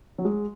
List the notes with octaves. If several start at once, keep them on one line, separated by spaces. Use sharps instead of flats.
F#3
G#3